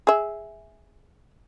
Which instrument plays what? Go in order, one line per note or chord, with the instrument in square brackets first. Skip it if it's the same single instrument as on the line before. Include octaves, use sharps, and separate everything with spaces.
[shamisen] G#4 E5